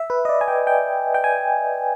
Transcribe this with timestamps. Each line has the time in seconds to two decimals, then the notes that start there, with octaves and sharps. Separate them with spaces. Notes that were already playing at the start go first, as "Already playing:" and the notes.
Already playing: E5
0.10 B4
0.25 D#5
0.29 D5
0.41 G#5
0.48 G5
0.67 G5
1.14 G5
1.24 G#5